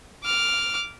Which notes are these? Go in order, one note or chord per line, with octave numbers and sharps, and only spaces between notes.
D6 F6